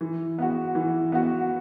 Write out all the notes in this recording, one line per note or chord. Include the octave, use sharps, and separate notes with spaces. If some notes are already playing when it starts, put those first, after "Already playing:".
E3
B3 F#4
E3
B3 F#4